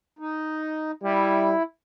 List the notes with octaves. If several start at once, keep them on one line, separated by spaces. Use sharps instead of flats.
D#4
G3 E4